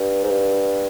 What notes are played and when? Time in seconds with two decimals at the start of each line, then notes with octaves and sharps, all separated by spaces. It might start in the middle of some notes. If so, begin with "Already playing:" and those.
Already playing: G2
0.23 G#2
0.30 G2